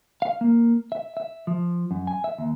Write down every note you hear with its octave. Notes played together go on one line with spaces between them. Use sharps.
F5
A#3
E5
E5
F3
F#2
G#5
E5
D#2